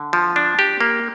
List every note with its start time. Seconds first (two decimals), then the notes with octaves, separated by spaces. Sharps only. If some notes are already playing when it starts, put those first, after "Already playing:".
Already playing: D3
0.13 F3
0.36 D4
0.59 G4
0.81 A#3